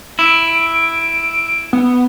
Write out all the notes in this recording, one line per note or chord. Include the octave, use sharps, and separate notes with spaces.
E4 D7
B3